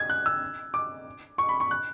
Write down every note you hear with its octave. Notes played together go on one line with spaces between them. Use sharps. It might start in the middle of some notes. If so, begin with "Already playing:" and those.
Already playing: G#6
F#6
E6
D6
C#6
B5
C#6
F#6